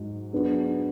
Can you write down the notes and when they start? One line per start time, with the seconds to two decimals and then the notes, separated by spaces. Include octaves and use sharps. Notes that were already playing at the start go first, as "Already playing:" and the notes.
Already playing: G#2 F#3
0.33 F#3 B3 D4 G#4